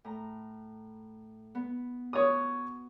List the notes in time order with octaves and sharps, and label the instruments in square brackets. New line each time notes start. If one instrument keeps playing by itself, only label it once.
[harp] A2 A#5
B3
[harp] F#4 [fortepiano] C#5 D#6